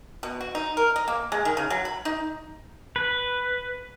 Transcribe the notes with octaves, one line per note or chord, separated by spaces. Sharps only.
B2
F#4
D#4
A#4
D#5
A#3
G#3
D#3
C#3
F#3
B5
D#4
B4